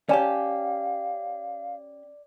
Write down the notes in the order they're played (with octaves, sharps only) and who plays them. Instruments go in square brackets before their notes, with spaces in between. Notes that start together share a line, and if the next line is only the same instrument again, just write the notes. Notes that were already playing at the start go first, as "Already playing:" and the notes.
[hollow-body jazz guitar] C#4 G4 [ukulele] C#5 G#5 A5 [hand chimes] D5 [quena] F5